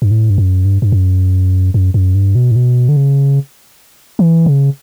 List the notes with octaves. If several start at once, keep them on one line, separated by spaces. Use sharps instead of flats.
G2
A2
G2
F#2
G2
G2
F#2
F#2
F#2
G2
B2
A2
B2
D3
C#3
E3
C#3